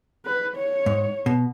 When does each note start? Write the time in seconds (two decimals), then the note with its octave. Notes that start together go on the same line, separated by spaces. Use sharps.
0.26 B4
0.56 C#5
0.86 G#2
1.26 B2